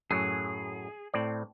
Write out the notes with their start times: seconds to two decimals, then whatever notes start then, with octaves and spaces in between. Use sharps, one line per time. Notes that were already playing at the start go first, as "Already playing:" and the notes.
0.11 F#2 A2 F#3 G#4
1.14 A2 C4 D5